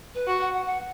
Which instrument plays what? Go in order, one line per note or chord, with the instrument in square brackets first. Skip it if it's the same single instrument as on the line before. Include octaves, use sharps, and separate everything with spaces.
[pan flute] B4
[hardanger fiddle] F#4
[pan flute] F#5
F#5
F#5